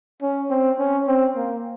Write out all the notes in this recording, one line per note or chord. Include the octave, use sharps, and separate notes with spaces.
C#4
C4
C#4
C4
A#3